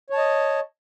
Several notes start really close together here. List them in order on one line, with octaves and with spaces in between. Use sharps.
C#5 A5 D#5